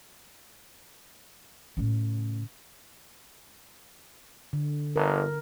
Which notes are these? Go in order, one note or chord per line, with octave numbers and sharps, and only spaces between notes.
A2 C#3
D3
G1 A#4